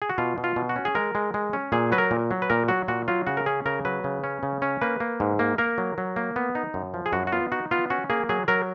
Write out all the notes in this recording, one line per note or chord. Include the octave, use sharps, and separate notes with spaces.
G#4
F#4
B2 F4
B2
F4
B2
F#4
C#4
G#4
G#3 A#4
G#3
G#3
C#4
A#2 G#4
F#3 B4
A#4
A#2
F#3
B4
A#2 A#4
F#3 F#4
A#2 F#4
F#3 F4
C#3 F#4
A#4
C#4 G#4
C#3 A#4
F#3 B4
C#3
C#4
C#3
C#4
A#3 B4
A#3
G#2
A#3
A#3 A#4
F#3
F#3
A#3
B3
D#4
F#2
F3
G#4
F#2 F#4
F#4
B3 F4
D#4 F#4
B3 F4
C#4 F#4
A#3 G#4
F#3 G#4
F#3 A#4